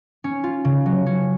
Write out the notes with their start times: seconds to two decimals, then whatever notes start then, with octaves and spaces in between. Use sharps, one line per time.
0.24 C#4
0.44 F4
0.65 C#3
0.86 F#3
1.06 C#4